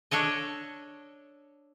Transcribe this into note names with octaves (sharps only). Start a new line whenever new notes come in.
D4 A4 C#5 D#5